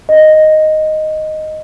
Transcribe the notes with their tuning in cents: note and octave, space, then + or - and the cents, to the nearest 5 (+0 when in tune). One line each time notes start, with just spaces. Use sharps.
D#5 +0